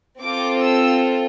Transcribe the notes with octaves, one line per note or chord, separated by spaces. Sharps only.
C4 F4 A4 D6
E6